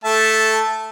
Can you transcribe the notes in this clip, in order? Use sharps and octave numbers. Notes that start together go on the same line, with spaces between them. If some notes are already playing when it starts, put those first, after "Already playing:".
A3 E5 A5